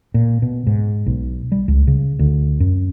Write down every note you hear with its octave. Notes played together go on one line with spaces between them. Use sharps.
A#2
B2
G#2
B1
G3
C#2
C#3
D2
F#2